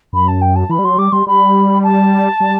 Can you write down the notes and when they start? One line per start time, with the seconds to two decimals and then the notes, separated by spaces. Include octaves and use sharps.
0.13 F#2 B5
0.27 A5
0.41 G5
0.55 A5
0.69 E3 B5
0.79 G3
0.84 F#3 C6
0.98 G3 D6
1.12 G3 C6
1.27 G3 B5
1.83 A5
2.40 G3